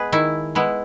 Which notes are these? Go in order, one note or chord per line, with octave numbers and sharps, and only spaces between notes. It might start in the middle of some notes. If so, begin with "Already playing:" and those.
Already playing: G#3 B3 G#4 B4
D#3 E4
G#3 B3 E4